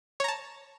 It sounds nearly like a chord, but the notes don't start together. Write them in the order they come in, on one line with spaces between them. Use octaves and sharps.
C#5 A#5 A5